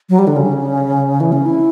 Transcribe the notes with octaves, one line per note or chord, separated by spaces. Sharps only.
F#3
G3
D3
C#3
E3
C#4
E4